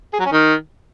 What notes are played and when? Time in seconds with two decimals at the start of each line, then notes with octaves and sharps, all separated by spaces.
0.13 G#4
0.19 F#3
0.26 C#4
0.32 D#3